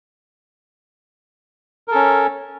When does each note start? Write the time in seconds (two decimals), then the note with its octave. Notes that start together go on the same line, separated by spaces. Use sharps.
1.88 A#4
1.91 A4
1.95 C#4